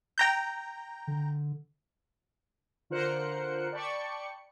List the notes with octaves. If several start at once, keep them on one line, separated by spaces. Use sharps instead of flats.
G5 A#5 G6
D3
D3 F4 A#4 C5 F#6 C#7
D5 G5 A5 B5 C#6 C#7